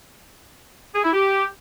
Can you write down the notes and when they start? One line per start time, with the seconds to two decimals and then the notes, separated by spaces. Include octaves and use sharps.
0.95 G#4
1.04 E4
1.13 G4